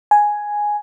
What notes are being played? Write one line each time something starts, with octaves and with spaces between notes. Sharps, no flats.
G#5